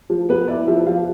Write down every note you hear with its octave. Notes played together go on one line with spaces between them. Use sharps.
F3
B3 B4
E4 D5
F3 E5
F3 F5